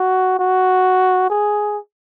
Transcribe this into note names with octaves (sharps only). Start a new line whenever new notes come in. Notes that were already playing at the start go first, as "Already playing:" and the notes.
Already playing: F#4
F#4
G#4